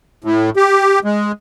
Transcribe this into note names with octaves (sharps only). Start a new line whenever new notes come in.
A2
G4
G#3